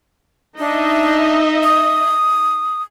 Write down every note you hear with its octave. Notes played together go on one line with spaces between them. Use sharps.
D4 D#4 D#5 E5
D#6